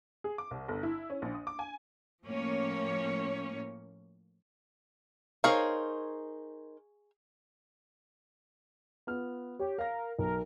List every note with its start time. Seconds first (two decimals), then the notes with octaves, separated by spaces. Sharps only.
0.24 G#4
0.38 D6
0.51 C2
0.68 G1
0.83 E4
1.10 C#4
1.22 A#1
1.34 D#6
1.47 D6
1.59 G#5
2.25 A2 F3 A#3 C#4 C#5
5.44 D#4 G#4 A#4 C5 C#5 F5
9.07 B3 F4 F6
9.60 G4 C#5
9.78 A#4 F5 A#6
10.19 B1 A#4